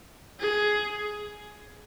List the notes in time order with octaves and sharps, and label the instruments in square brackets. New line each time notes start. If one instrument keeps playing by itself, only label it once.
[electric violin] G#4